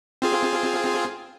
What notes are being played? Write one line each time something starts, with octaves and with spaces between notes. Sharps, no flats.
C4 F4 G#4